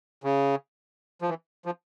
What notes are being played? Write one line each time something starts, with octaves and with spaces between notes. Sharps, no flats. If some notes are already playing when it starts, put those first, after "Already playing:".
C#3
F3
E3
F3